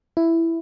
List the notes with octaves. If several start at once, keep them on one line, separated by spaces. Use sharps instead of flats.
E4